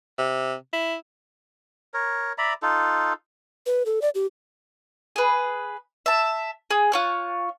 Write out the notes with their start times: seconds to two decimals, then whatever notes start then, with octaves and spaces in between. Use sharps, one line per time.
0.18 C3
0.73 E4
1.94 A#4 C#5
2.38 D5 E5 A#5 B5
2.62 D#4 F4 A4
3.66 B4
3.86 A4
4.02 D5
4.15 G4
5.16 G#4 B4
6.06 E5 A5
6.71 G#4
6.92 F4 C#5 F#6